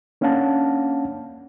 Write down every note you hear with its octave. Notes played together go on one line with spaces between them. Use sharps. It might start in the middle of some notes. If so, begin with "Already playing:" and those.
A#3 C#4 D4 F5 F#5 A5